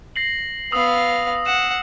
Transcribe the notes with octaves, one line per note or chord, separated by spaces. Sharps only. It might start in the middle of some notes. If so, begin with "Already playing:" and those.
A#6 C7 F#7
B3 F5 D#6 E6
F#5 E7